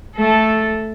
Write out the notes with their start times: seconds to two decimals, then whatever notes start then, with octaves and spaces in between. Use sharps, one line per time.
0.16 A3 A4